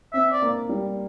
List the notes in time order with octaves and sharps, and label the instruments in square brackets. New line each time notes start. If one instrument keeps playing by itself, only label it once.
[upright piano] C4 [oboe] E5
[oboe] D5
[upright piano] A#3
G3